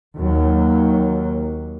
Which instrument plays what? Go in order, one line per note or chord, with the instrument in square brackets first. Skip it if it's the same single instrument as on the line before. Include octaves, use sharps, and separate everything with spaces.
[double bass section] D#2 F#3